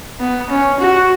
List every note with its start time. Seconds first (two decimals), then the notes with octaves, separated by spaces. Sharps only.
0.20 B3
0.50 C#4
0.80 F#4